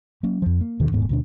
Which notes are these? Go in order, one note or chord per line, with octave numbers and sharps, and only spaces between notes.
F#3 A#3 C#4
F2 F3
A#3
D#2 B2 D3 D#3
D#1 G#2 B3
D2 B2 D4